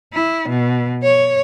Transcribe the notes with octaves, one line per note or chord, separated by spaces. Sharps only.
E4
B2
C#5